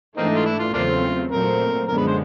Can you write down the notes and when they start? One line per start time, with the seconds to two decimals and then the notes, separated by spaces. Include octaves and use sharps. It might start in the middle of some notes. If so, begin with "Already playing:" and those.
0.17 G#2 E3 A3 A#3 C4 D4 D#4
0.35 F4
0.46 E4
0.59 F4
0.74 E2 C#3 F#3 A3 A#3 C4 D4 F4
1.31 A#2 F#3 A3 C4 A#4
1.88 F#2 D3 F3 G#3 B3 A#4
1.98 B4
2.07 C5